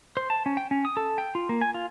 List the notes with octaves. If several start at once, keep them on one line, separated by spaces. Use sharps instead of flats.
C5
A5
C#4
G5
C#4
D#6
A4
G5
F4
A#3
G#5
F4